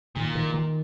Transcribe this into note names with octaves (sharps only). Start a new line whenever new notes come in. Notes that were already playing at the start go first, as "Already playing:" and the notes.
A#2 D#3
D#3
D#3